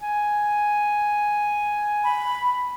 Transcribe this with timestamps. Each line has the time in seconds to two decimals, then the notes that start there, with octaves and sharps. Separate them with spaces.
0.01 G#5
2.04 B5